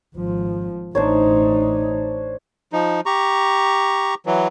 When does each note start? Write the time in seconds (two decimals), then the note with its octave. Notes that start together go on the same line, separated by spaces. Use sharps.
0.15 G#1 F3
0.95 A1 D4 D#4 C5 C#5
2.73 F3 D#4
3.06 G4 A#5 C#6
4.26 E3 F#3